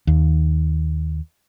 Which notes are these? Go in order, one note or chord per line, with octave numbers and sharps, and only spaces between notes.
D#2